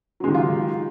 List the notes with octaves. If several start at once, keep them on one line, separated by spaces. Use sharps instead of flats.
D#3 F#3 G#3 F4 G4